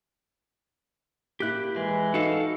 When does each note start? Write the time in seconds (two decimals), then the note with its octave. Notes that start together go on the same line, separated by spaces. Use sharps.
1.40 A#3 E4 G4 F#6
1.76 E3 G#3
2.14 D#4 F#4 A4 F5